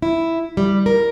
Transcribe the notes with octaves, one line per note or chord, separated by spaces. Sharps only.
E4
G3
A#4